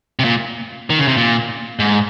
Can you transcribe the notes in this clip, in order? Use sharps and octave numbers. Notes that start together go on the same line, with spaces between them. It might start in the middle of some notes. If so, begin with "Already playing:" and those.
C3
A#2
D#3
C#3
C3
A#2
G#2